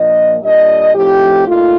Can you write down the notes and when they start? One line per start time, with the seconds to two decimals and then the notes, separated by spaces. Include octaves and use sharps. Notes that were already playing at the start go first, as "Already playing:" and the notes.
Already playing: A#2 F3 A#3 D4 D#5
0.42 A#2 G3 D4 D#5
0.95 A2 F3 A3 C4 D#4 G4
1.47 A#2 A3 D#4 F4